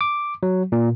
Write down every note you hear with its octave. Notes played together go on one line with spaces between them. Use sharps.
D6
F#3
A#2